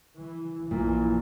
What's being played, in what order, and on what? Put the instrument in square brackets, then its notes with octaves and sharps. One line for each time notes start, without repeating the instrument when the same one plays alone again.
[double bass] E3
[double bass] A#1 E3 [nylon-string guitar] A#2